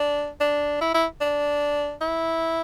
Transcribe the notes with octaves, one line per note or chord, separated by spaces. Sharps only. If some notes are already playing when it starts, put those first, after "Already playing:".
Already playing: D4
D4
E4
E4
D4
E4